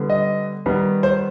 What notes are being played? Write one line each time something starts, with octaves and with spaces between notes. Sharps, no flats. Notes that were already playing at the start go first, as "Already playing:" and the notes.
Already playing: D3 G3 B3
D#5
D#3 G3 B3
C5